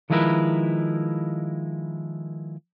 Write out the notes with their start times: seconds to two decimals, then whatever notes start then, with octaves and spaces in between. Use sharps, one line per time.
0.10 D#3 F3 G#3 E4 A#4 B4